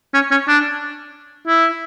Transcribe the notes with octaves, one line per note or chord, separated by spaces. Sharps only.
C#4
C#4
D4
E4